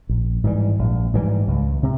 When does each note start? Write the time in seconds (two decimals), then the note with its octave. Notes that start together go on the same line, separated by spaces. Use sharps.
0.09 A#1
0.44 G#2 E3 G3
0.79 A#1
1.14 G#2 E3 G3
1.48 C#2
1.83 C3